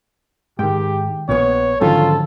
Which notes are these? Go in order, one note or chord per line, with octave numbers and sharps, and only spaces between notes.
G#2 D#3 G4 G5
A#1 A#2 B3 C#5
G#2 D3 D#3 F3 F#3 C#4 F4 A4